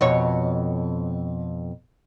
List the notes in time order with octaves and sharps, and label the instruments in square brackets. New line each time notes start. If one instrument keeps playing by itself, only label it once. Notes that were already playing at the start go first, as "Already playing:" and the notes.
[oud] F2 B2 C#5